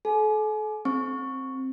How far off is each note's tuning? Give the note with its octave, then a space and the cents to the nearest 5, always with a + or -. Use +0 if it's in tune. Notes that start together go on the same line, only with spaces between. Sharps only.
A4 -35 G#5 +35
C4 +10 C#6 +0